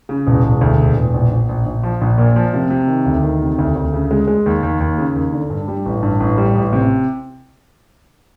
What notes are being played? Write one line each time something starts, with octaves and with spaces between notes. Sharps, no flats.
C#3
E1
E1
D2
E1
E1
A#1
A#1
A#1
A#1
F3
A#1
A#2
F3
C3
C3
D#3
D2
D#3
C3
D2
D2
C#3
G#3
G#3
D#2
D#2
D#2
C#3
D#2
D3
G2
G3
A1
G2
A1
G3
A1
C3